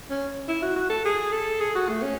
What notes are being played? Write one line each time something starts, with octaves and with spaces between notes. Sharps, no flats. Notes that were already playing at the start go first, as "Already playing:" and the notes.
C#4
E4
F#4
F#4
A4
G#4
A4
G#4
F#4
A3
C#4